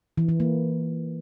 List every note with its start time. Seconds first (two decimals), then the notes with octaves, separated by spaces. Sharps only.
0.18 E3
0.29 E3
0.40 A#3